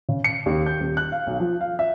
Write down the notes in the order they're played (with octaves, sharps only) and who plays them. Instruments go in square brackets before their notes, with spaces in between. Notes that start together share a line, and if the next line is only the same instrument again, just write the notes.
[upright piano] C#3
C#7
D#2
G6
D#1
F#6
F5
B1
F3
F5
E5